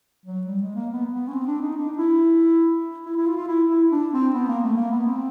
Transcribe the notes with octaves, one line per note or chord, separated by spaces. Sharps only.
F#3
G3
G#3
A#3
B3
B3
C#4
C4
D4
D#4
D4
E4
E4
E4
F4
F4
E4
E4
D4
C4
B3
A#3
A3
A#3
B3
C4